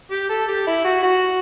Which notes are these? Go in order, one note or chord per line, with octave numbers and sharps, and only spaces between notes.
G4
A4
G4
E4
F#4
F#4